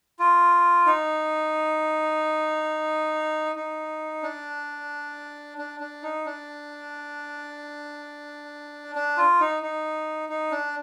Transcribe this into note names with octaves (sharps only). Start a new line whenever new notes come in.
F4
D#4
D#4
D4
D4
D4
D#4
D4
D4
F4
D#4
D#4
D#4
D4